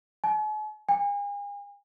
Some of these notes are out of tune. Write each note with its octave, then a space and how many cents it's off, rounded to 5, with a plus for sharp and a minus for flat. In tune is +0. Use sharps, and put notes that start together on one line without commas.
G#5 +45
G#5 -40